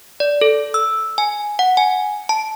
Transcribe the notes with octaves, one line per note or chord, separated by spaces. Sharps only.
D5
A4
E6
G#5
F#5
G#5
A5